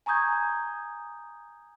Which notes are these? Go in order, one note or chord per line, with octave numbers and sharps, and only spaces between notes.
G#5 A#5 C#6 D#6 G6 G#6